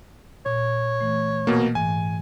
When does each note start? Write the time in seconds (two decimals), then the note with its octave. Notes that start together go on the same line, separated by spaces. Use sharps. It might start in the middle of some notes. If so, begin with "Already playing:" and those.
0.46 A#2 C#5
1.01 E3 A3
1.47 B2 A#3
1.75 G#2 E3 G#5